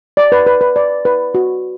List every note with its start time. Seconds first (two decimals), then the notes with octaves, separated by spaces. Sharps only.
0.17 D5
0.32 B4
0.47 B4
0.61 B4
0.76 D5
1.05 B4
1.35 F#4